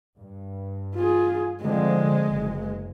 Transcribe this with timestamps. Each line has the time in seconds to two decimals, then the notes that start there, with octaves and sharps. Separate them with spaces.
0.18 G2
0.95 F4 G#4
1.62 D3 F3 G#3 C4
2.28 F#1